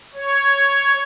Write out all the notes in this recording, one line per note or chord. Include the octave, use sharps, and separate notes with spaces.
C#5